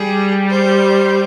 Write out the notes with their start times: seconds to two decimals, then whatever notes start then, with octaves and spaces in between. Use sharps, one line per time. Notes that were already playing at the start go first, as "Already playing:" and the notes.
Already playing: G3 G#4
0.50 C5